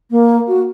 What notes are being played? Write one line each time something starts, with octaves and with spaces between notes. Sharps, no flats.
A#3
F#4